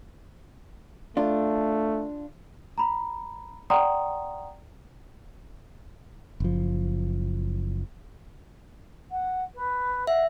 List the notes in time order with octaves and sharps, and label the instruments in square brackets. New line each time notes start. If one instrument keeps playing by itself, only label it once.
[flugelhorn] A3 [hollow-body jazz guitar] D4 F4
[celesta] A#5 B5
D5 F#5 G5 A#5 C6 D#6
[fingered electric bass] F#1 F3
[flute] F#5
B4
[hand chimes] E5 [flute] F#5